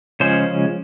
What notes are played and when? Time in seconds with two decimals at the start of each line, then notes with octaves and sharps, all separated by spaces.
0.20 C#3 F3 G#3 C#4 C5